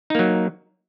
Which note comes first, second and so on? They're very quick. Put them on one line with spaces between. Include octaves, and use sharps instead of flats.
D#4 A#3 F#3